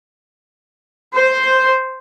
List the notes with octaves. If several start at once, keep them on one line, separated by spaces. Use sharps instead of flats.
C5